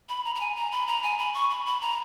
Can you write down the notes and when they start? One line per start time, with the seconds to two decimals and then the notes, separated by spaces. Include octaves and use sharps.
0.09 B5
0.25 A#5
0.35 A#5
0.40 G#5
0.56 A#5
0.72 B5
0.87 A#5
1.03 G#5
1.19 B5
1.34 C#6
1.50 B5
1.66 B5
1.81 A#5